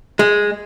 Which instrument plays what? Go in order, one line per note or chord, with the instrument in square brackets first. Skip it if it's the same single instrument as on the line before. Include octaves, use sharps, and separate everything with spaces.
[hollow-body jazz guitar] G#3